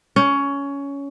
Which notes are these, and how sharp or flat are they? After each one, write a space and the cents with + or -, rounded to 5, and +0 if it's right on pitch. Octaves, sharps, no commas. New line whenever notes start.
C#4 +15